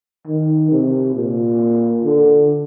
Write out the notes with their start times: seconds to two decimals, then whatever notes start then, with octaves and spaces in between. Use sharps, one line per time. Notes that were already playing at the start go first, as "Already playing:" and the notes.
0.27 D#3
0.71 C3
1.15 A#2
2.05 D3